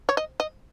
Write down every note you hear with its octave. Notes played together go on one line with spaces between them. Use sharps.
C#5
D#5
D#5